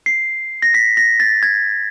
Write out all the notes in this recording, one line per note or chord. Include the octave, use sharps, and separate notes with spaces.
C7
A#6
B6
A#6
A6
G#6